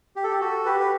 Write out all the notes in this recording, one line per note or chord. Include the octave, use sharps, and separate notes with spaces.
G4
A4
G4
F#4 A4
G4 B4
B4